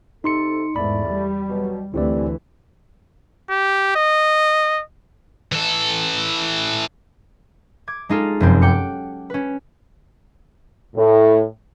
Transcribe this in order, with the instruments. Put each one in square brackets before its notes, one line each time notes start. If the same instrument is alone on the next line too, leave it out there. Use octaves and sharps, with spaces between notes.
[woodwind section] C3 A4 [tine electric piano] D#4 C6 C#7
[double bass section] E2 G#2 [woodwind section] A3 D5 [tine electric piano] B5
[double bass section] G3
[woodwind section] B2 F#3
[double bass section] D2 E3 A3 [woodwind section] C4 [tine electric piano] E4 G4 D5
[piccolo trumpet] G4
D#5
[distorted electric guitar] E3 A4
[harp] D6 G#6
G#3 D#4 F4 A4
F1 F#2 C4
F#5 G5 D6 C#7
C#4 B4
[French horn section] A2